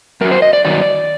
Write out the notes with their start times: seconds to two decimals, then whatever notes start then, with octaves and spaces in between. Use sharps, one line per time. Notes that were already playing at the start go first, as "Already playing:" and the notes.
0.21 F#2 A#4
0.25 F#3
0.31 C5
0.42 D#5
0.53 D5
0.65 G2 D#3 F#3 D5